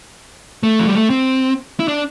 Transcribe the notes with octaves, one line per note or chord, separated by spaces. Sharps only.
A3
F3
G3
A3
C4
E4
D4